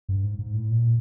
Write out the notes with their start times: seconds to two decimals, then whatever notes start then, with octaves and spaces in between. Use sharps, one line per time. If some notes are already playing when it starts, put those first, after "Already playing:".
0.09 G2
0.24 G#2
0.39 G#2
0.54 A2
0.71 A#2